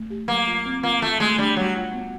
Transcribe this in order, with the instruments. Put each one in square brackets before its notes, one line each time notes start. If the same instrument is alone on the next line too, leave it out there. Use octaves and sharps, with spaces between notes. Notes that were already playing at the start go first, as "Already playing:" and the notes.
Already playing: [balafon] A3
G4
[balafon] F#3 [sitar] A#3
[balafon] F4
C4
[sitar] A#3 [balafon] F4
[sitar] A3 [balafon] F4
[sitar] G#3 [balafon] A3
[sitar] G3 [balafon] D4
[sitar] F#3 [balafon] G3
[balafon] F4
B3